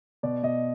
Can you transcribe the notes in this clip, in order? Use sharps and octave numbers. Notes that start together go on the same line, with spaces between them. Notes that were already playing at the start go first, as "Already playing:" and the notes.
B2 D5
B2 D#5